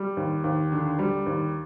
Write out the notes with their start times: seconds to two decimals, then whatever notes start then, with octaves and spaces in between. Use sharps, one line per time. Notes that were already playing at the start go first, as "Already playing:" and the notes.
Already playing: G3
0.17 D#2
0.44 D#2
0.72 D3
0.99 G3
1.26 D#2